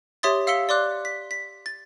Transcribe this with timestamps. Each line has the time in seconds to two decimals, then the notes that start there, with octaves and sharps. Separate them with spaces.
0.23 G4 C#5 E5 C6 D#6 A6
0.47 F5 E6 B6 C#7 G7
0.69 D5 C6 D6 F#6
1.05 B6
1.31 B6
1.66 A6